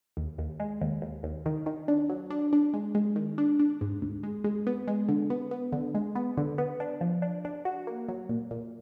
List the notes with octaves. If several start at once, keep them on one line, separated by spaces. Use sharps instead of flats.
D#2
D#2
G#3
D#2
D#2
D#2
D#3
D#3
D4
F#3
D4
D4
G#3
G#3
D#3
D4
D4
G#2
D2
G#3
G#3
B3
G#3
D3
B3
B3
D3
G#3
B3
D3
B3
D4
F3
D4
D4
F#4
A#3
F#3
A#2
A#2